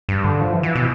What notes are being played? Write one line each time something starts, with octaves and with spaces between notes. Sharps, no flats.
G2
D3
F3
E3
E3
B2